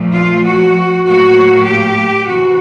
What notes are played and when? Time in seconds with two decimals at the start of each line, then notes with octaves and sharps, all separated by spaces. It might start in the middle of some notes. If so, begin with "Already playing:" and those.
Already playing: A#2 F3 A3
0.13 F4
0.44 F#4
1.04 A2 F#3 A#3 F#4
1.66 G4
2.27 C3 E3 F#4